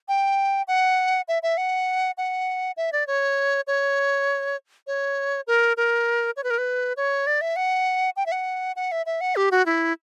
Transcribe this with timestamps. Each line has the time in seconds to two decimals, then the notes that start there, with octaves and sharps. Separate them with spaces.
0.08 G5
0.68 F#5
1.28 E5
1.43 E5
1.57 F#5
2.18 F#5
2.77 E5
2.92 D5
3.07 C#5
3.67 C#5
4.87 C#5
5.47 A#4
5.77 A#4
6.37 C#5
6.44 B4
6.50 A#4
6.58 B4
6.97 C#5
7.27 D5
7.41 E5
7.56 F#5
8.16 G5
8.26 E5
8.32 F#5
8.76 F#5
8.92 E5
9.06 E5
9.21 F#5
9.36 G4
9.51 F#4
9.66 E4